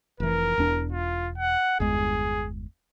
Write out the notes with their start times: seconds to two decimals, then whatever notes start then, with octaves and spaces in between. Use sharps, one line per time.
0.20 F1 E3 A#4
0.58 E1 E2 D4
0.92 F4
1.38 F#5
1.80 G1 E2 G#3 G#4